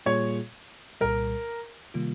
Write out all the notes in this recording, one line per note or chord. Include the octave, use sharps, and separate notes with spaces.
A#2 G3 A#3 F4 G#4 C#5
C2 A#2 G3 A#4
C3 D#3 G3 A#3 F4